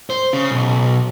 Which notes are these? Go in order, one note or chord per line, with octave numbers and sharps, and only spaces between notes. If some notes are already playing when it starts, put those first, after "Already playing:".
C5
C#3
B1